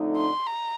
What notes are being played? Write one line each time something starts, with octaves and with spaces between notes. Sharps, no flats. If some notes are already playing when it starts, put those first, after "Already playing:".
Already playing: F2 D3 A3 D#4
C6
A#5